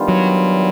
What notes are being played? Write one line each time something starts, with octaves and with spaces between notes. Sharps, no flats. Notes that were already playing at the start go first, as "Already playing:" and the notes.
Already playing: D#3 G3 B3 D4 F4
F#3